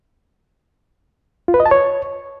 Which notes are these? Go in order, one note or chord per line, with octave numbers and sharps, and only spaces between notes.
F4
B4
D#5
A5
C#5